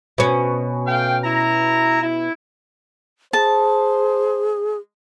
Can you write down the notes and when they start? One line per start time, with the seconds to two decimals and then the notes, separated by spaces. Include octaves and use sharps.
0.18 B2 C#4
0.86 A3 F5 G5
1.24 E4 A#5
2.02 E4
3.33 G#4 C5 A5